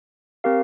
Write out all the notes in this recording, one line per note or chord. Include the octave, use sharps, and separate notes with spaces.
C4 G4 A#4 F5